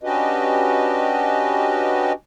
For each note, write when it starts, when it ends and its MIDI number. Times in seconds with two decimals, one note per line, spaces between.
0.03 2.12 61
0.03 2.12 62
0.03 2.12 66
0.03 2.12 67
0.03 2.12 71
0.03 2.12 75